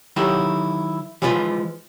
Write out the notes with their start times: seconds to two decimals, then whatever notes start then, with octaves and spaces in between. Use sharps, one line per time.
0.16 D#3 F#3 E4 F#4 G4 A4
1.22 E3 F3 G#3 F4 B4